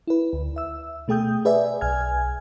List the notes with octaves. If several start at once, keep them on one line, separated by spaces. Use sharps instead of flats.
E4 B4
D2
E5 E6
B2 A3 G#4 G5 D#6 G6
G#4 B4 D5 E5 G#5
B1 G#5 F6 G#6